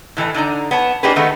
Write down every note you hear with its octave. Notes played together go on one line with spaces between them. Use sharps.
A2 E3 A4 D#5
D3 D4 D#4 A#5
B3 C#5 A5
A#3 D4 D#4 G4 G#4 B4
D#3 G#3 A3 B3 D#4